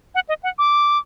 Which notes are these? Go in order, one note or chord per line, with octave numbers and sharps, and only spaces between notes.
F#5
D#5
F#5
D6